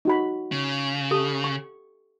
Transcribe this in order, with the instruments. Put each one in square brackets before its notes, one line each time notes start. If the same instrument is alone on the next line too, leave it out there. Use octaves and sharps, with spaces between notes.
[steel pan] D#4 F#4 B5
[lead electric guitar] C#3
[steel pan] G4 A4 D#6
C#6